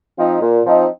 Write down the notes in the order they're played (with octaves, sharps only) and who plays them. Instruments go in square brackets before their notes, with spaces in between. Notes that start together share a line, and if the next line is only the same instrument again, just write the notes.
[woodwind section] F3 C4 D#4
A#2
F3 C4 D#4